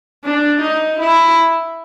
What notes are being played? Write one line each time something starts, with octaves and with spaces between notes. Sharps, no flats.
D4
D#4
E4